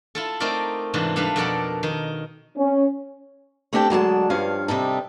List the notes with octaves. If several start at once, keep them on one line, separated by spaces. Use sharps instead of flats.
E4 F4 A4
A3 C4 D#4 A#4 D5
G#2 C3 E3 D4 F4
G3 D4 A4 B4 F5
F2 B2 A4 A#4 D5 F#5
D#3 D#4
C#4
A3 C4 D4 G4 A4 G5
D3 F#3 G#3 A5
G2 F3 C#4 F5
C3 G3 D#4 A4